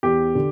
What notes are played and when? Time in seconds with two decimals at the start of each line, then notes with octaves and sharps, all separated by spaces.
0.03 E2 G4
0.35 D3